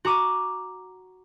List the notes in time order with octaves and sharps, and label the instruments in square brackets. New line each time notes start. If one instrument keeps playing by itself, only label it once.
[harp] F#4 A#5 D6 D#7